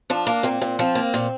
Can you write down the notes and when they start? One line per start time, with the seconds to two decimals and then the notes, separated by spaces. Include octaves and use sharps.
0.10 F3 D4
0.27 A#3
0.43 A#2 C4
0.61 A#2
0.79 F3 C4
0.95 A#3
1.14 A#2